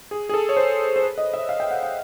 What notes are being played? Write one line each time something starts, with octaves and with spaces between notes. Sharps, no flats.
G#4
G#4
A4
C#5
C5
C5
B4
D#5
E5
F5
G5
F#5
F5